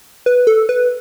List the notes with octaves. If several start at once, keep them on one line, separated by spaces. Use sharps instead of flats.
B4
A4
B4